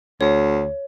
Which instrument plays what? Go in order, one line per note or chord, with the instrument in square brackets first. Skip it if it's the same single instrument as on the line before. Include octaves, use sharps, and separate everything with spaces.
[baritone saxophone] D2 [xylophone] C#5